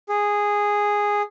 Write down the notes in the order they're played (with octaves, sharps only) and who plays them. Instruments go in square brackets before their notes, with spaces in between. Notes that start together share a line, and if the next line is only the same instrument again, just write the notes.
[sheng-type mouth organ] G#4